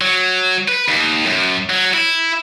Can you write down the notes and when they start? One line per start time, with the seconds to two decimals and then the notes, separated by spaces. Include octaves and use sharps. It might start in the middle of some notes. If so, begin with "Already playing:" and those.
0.01 F#3
0.68 B4
0.88 D#2
1.26 F#2
1.70 F#3
1.93 E4